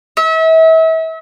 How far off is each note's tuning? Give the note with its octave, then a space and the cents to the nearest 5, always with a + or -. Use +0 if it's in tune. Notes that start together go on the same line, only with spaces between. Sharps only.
E5 -35